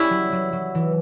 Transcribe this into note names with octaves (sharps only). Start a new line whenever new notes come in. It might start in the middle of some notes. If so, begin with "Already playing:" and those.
Already playing: G3 C#4 E4
F#3
F#3
F#3
E3